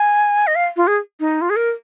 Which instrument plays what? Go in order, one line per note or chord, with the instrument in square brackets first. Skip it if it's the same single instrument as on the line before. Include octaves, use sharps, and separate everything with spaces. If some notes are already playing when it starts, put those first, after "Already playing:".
Already playing: [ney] G#5
D#5
F5
F4
G#4
D#4
F4
G#4
A#4